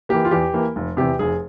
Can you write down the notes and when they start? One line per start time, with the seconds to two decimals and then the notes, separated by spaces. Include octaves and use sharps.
0.09 E3 A#3 G4
0.25 F4
0.31 E2 G4
0.53 E3 A#3
0.76 F1
0.97 E2 C3 G4
1.19 F1 G#4